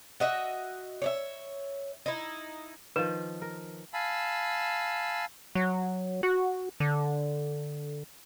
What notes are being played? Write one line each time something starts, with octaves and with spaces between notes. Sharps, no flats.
F#4 D#5 E5
C#5 D5 E5
D#4 E4
D#3 F3 B4
A#4
F5 G#5 A5 B5 E6
F#3
F#4
D3